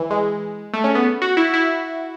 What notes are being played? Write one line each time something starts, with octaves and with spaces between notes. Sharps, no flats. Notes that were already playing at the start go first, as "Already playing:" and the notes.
Already playing: E3
G#3
A3
C#4
B3
F#4
E4
E4